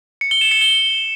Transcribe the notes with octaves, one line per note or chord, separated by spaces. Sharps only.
C#7
G7
E7
C#7
G7